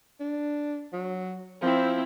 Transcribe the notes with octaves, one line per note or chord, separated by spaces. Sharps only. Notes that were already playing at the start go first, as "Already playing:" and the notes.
D4
F#3
F3 C4 E4